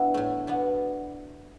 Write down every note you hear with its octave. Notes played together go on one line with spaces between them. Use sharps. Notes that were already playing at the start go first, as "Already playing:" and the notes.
Already playing: B3 D4 E4
A2 A3
B2 B3 D4